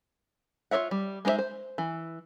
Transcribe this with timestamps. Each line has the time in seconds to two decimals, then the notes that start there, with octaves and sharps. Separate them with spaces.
0.71 F4 G#4 C#5 E5 F#5
0.91 G3
1.25 G#3 D#4 B4 C5 E5
1.39 C5
1.78 E3